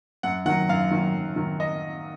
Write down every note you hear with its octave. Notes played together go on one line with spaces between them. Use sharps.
F#2 F#5
D#3 F#3 F#5
F#2 F5
D#3 F#3
F#2
D#3 F#3
D#5